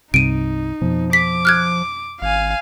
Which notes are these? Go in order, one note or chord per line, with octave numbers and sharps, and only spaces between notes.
C2 G2 C3 D#4 D7 D#7
F2 B2 F3
D6 B6
F6 F#6 G#6
G#1 F5 G#5